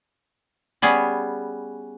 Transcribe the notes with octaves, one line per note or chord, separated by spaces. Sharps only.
G3 B3 C#4 G#4